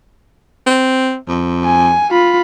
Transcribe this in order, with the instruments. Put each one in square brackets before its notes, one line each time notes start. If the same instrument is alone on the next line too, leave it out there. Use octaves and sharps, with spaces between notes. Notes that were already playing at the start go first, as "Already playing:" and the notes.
[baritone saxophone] C4
F2
[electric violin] G#5
F4 B5